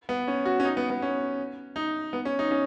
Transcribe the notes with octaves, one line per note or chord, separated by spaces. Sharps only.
B3
C#4
F#4
C#4
D#4
B3
B3
C#4
D#4
B3
C#4
D#4
C#4